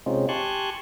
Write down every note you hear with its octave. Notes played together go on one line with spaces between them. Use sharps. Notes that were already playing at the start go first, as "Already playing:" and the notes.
C3 G#3 C4 C#4 D#4 F4
G4 G#5 A5 C6 C#6 F#6